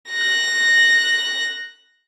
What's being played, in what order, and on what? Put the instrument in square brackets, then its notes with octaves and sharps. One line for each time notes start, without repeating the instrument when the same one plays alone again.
[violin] F#6 A#6